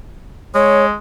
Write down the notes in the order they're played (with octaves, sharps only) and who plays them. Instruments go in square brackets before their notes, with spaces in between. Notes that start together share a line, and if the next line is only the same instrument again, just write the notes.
[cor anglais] G#3 [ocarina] C#5